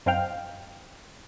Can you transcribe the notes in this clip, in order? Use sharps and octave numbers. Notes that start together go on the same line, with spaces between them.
F#2 C4 D#4 F5 G5 F6